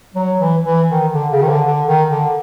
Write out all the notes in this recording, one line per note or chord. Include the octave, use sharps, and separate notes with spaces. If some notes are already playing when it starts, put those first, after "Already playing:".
F#3
E3
E3
D#3
D3
C#3
D#3
D3
D3
D#3
D3